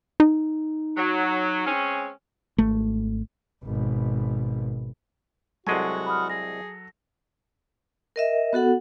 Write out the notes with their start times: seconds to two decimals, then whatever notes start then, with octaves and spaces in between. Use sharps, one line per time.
0.20 D#4
0.96 F#3
1.66 G#3 C4 C#4
2.58 G#1 A3
3.64 G#1 B2
5.67 C2 F#3 G#3 F#4 A4 G#5 C#6
6.06 B5 D#6 F6
6.29 G#4 A#6
8.16 A#4 D#5 E5
8.53 B3 F#4 A4 F#5